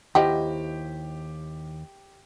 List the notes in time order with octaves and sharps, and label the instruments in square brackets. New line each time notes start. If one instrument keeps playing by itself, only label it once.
[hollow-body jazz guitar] D#2 [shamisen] F3 F#5 G5 [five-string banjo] E4 C5 D#5 [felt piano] G4